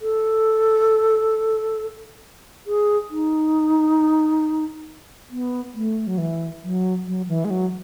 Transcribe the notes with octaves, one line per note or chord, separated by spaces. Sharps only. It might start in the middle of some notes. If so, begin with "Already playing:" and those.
A4
G#4
D#4
B3
A3
F#3
E3
F#3
F#3
E3
G#3
F#3